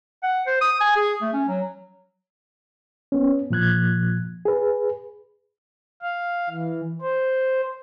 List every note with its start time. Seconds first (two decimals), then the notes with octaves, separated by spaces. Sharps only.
0.23 F#5
0.47 C5
0.61 D#6
0.81 G#5
0.96 G#4
1.21 A3
1.33 C#4
1.48 F#3
3.12 B3 C#4
3.50 A#2 F3 F#6 G#6
4.45 G#4 B4
6.02 F5
6.49 E3
7.01 C5